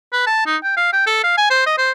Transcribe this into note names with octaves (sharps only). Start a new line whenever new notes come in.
B4
A5
D#4
G5
F5
G5
A4
F5
G#5
C5
D#5
C5